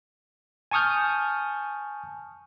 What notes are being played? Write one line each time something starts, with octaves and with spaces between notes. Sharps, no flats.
G#5 A5 C#6 D#6 F6 G6